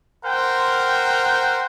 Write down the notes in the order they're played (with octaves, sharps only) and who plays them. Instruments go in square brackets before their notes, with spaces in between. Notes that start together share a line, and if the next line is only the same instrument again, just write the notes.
[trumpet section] A#4 C5 F#5 G5